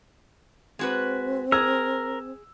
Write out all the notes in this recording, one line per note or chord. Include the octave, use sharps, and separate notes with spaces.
G#3 C4 F#4 B4
G#4 A#4 E6